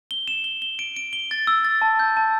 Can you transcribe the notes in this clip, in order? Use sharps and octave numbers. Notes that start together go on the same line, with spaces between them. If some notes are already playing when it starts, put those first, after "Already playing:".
G7
E7
G7
G7
D7
D7
G7
A6
E6
A6
A5
G6
A5